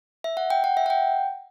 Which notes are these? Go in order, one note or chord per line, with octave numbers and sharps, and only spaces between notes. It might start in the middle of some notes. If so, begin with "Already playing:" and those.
E5
F#5
G5
F#5
E5
F#5
G5